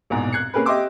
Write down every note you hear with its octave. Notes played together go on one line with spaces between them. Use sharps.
A#1 E2 G#2 B2
F#6 G#6 C7 C#7
A#3 C#4 G#4 A#4 B4
G4 D#5 E5 C6 D6 E6